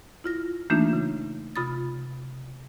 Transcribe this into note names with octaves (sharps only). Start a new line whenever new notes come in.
E4 F4 A#6
E3 A3 A#3 D4 D#4 F4
C#3
C3 F4 B5 D#6 A6